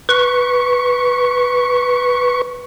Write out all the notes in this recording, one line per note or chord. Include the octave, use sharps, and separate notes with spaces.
B4 C#6